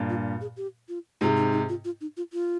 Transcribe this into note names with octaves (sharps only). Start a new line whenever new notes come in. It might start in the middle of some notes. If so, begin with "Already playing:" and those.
Already playing: G2 A#2
F4
G#4
G4
F4
G#2 C3 F4
D#4
D#4
F4
F4
D#4
F4
F4